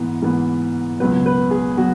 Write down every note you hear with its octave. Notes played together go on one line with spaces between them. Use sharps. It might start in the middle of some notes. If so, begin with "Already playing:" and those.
Already playing: G#2 E3 B3
G#2 E3 B3
C#2 B2 F#3 B3 B4
B4
G#4
F#3 B3 F#4